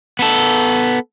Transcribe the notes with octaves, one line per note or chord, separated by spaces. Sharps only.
B3 A4